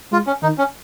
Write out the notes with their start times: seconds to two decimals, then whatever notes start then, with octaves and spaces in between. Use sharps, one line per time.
0.12 G#3 F4
0.27 C#4
0.42 D#3 D#4
0.58 C#4